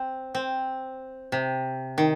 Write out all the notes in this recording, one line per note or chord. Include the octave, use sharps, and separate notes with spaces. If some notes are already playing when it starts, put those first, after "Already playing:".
Already playing: C4
C4
C3
D#3